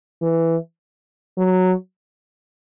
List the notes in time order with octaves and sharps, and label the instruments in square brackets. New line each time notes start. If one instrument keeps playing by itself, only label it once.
[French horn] E3
F#3